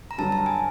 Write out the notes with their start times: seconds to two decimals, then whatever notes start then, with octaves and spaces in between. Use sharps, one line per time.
0.11 A#5
0.18 G2 D3 F#3 A5
0.32 A5
0.46 G#5